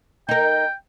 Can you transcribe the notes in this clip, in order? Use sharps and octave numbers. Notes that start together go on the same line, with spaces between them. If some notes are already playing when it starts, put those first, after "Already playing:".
D#4 A#4 G5